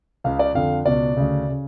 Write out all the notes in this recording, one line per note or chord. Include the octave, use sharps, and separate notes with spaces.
C#2 C#3 F5
D5
F2 D3 F5
C#2 B2 D5
D2 C#3
C#3